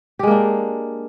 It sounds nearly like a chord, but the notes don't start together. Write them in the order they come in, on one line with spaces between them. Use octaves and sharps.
G4 G#3 A#3 D4